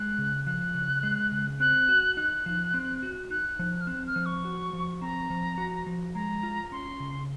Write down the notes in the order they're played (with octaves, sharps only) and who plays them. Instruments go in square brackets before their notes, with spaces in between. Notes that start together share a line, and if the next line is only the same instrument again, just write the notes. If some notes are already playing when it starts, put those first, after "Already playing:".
Already playing: [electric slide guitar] G#3 [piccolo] F#6
[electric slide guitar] C#3
[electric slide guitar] F3 [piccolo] F#6
[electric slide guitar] C#3
G#3
C#3
[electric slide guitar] C4 [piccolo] F#6
[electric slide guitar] F#4
[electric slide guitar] D#4 [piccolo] F#6
[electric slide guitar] F3
C4
F#4
[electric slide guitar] D#4 [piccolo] F#6
[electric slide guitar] F3
[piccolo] F6
[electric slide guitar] C4 [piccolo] F#6
[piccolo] F6
[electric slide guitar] F3
[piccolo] C#6
[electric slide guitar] F#4
F3
[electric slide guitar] C4 [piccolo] A#5
[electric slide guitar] F3
F#4
F3
[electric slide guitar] G#3 [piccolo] A#5
[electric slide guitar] F4
[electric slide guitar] C#4 [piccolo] C6
[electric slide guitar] C#3